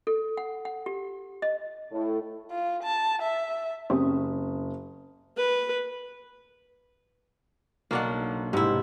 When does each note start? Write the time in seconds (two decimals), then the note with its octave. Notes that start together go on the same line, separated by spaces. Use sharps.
0.07 A4
0.37 F#5
0.65 F#5
0.86 G4
1.42 D#5
1.92 A2
2.51 F4
2.84 A5
3.22 E5
3.90 F#1 C4 C#4 G4 D#6
5.37 B4
7.91 B1 A#3 D4 F#5
8.53 G#2 C3 E4